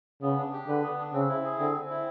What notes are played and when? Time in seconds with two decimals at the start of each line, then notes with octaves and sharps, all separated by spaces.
0.22 C#3 B3
0.38 D4
0.53 G4
0.67 D3 B4
0.83 B3
0.98 D4
1.13 C#3 C4
1.29 E4
1.44 G#4
1.59 D3 C4
1.74 C4
1.90 E4